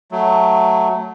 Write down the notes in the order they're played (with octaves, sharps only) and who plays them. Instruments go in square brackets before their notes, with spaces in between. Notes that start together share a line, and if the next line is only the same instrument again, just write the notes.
[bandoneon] F#3 A3